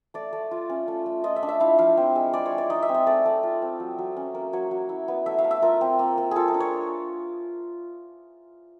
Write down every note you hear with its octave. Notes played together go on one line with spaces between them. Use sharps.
A3 D5
A3
F4
C#4
A3
A3
F4 D#5
E5
D4
E5
E4 F5
F3 F5
C4
G#3
G#3 D5
C#5
G#3
D5
D#4 D#5
E5
C4
D#5
A3 D5
A3
F4
C4
F#3
F#3
C#4
A#3
F#3 C#5
F#3
E4
B3
A3 E5
F5
A3
E5
F4 A#4
C4
A#3
A#3
F4 G#4 A4
A#4
D4
C#5